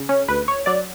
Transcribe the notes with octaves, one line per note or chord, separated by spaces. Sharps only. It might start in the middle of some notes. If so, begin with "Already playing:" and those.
Already playing: C#3
C#4
D2 B4
C#5
F#3 D5